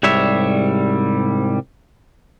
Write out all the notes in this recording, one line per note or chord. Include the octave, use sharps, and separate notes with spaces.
C2 G#2 G3 C#5 E5